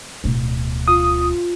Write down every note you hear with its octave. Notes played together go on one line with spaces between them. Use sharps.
D1 B2
F4 D#6